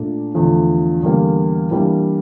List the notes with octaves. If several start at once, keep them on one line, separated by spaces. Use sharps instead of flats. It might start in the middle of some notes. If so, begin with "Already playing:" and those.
Already playing: A#2 A3 D4
E2 D3 F3 A3 D4
E2 D3 G3 A#3
E3 G3 A#3 D4 G4